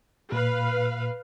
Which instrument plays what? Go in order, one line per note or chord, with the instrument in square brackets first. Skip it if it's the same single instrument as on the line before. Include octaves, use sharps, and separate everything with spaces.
[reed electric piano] A#2 [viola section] B4 F5